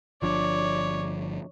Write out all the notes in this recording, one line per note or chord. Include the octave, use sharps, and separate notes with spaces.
G1 F3 D4 C#5 D5